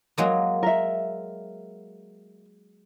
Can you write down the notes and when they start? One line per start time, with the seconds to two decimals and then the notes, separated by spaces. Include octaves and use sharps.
0.18 F#3 G#3 A#3
0.63 A#4 E5